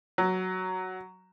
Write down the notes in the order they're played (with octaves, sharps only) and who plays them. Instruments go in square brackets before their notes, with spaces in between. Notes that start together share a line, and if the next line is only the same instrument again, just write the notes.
[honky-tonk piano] F#3